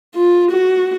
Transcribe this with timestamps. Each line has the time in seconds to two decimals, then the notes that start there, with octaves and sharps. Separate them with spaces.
0.15 F4
0.51 F#4